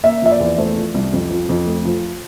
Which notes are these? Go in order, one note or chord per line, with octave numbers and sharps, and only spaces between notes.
A#3 E5
F3 E5
D5
E2
A3 C5
F3
C2
F2
F3
F2
A3
F3